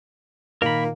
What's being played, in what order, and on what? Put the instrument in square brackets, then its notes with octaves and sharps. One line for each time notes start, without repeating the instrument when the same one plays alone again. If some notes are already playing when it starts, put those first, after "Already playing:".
[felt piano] A#2 D#3 [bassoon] A#3 [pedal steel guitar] A#4 B5